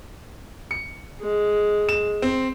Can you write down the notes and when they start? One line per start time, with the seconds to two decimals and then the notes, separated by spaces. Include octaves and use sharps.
0.71 C#7
1.21 G#3
1.89 E7
2.22 C4